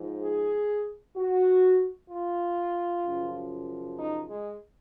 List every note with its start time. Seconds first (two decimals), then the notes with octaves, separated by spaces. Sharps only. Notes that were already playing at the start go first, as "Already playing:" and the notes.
Already playing: G#2 F3
0.23 G#4
1.17 F#4
2.10 F4
3.04 F#2 C#3 F3
3.98 D#4
4.30 G#3